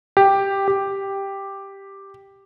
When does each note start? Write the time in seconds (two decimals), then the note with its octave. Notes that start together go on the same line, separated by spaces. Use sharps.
0.17 G4
0.68 G4